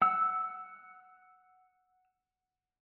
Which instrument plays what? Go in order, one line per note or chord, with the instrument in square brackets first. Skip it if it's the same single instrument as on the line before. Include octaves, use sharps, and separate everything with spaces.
[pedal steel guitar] F#5 E6